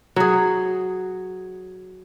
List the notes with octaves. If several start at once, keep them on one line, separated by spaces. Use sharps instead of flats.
F#3 G#4